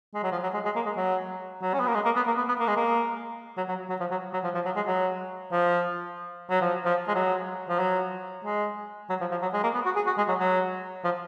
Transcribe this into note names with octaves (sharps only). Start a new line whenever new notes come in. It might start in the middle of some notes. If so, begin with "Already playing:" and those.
G#3
F#3
F3
F#3
G#3
G#3
A#3
G#3
F#3
F#3
C#4
B3
A#3
G#3
A#3
B3
A#3
B3
B3
A#3
G#3
A#3
F#3
F#3
F#3
F3
F#3
F#3
F3
F3
F#3
G#3
F#3
F3
F#3
F3
F3
G#3
F#3
F3
F#3
G#3
F#3
F3
F3
F#3
G#3
A#3
B3
F#4
G#4
F#4
G#3
F#3
F#3
F3